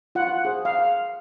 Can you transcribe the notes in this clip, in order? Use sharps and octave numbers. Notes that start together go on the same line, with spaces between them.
F4 F#5
G#4 C5
F5